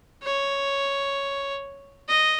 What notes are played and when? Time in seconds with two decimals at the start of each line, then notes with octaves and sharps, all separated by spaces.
0.24 C#5
2.08 D#5